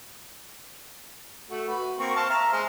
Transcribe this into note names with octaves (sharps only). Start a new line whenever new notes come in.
A3 F#4
F#4 B4
A#3 C4 C#6
C5 F5 A5
E5 A#5 F6
G#3 C5